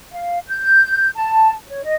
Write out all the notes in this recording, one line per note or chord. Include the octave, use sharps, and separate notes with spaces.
F5
G6
A5
C#5
D#5